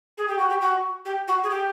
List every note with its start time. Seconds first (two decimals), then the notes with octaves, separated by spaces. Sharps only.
0.18 G#4
0.28 G4
0.39 F#4
0.50 G4
0.61 F#4
1.05 G4
1.28 F#4
1.43 G#4
1.50 G4